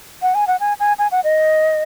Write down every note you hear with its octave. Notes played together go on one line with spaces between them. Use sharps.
F#5
G#5
F#5
G#5
G#5
G#5
F#5
D#5